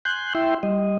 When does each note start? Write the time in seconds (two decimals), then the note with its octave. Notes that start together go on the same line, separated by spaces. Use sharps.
0.05 G#5 C6 F#6 G6
0.35 E4 E5 G5 C6
0.63 G3 D#5